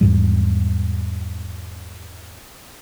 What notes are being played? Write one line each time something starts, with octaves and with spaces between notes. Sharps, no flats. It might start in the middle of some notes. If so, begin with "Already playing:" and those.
E2 G#2 G3